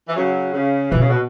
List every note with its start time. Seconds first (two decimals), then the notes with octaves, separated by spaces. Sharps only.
0.09 E3
0.16 C#3 F#3
0.54 C#3
0.91 B2 E3
1.01 C#3
1.10 B2